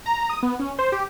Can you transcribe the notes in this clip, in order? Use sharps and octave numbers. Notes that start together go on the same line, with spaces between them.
A#5
D#6
B3
C#4
C5
G4